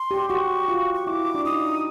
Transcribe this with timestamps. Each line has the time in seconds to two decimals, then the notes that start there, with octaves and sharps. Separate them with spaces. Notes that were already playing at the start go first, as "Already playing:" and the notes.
Already playing: C6
0.11 G4
0.29 F#4 C#6
0.68 F4
0.95 C#6
1.07 E4 D6
1.35 D4
1.45 D#4 D#6